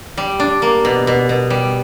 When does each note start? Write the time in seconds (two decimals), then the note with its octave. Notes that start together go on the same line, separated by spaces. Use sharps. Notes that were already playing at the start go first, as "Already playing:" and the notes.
0.17 G3
0.40 D4
0.62 A#3
0.85 B2
1.07 B2
1.29 B2
1.50 G3